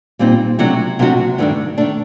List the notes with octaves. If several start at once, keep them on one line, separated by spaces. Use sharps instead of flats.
A#2 G3 C4 D#4
C3 F#3 A3 D4 F#4
C3 F#3 A3 D4 F#4
G2 D#3 A3 D4
D#3 A3 D4